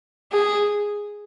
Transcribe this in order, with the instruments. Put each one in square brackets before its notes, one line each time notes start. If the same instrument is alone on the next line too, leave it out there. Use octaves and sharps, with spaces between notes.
[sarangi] G#4